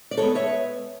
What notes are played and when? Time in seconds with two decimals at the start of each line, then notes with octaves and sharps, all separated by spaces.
0.11 D5
0.17 A2 G#3 B3 A4 C#5
0.35 C#5 E5